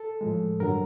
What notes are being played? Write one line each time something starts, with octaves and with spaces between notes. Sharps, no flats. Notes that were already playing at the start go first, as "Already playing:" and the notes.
Already playing: A4
A2 F3 G#3
G2 D3 F#3 A#4